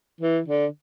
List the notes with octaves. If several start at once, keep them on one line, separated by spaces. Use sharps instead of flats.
E3
D3